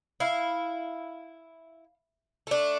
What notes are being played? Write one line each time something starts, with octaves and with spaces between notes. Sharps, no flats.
E4 F5
A3 D4